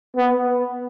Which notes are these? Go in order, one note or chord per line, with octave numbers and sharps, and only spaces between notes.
B3